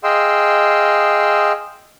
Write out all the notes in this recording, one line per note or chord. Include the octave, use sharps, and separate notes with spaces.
G#4 D#5 F5 G5 C6 E6